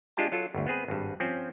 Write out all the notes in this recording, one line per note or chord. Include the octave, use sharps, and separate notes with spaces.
G#3 D4 F4 G4 G5 A5
F#3 F4 A4
G1 D2
B3 C4 G#4 B4
G#1 G2
F3 C4 C#4